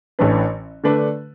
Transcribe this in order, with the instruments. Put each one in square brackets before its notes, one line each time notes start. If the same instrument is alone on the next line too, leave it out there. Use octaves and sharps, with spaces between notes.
[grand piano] A1 A2 E3 D4 B4
D3 A3 D4 B4 D5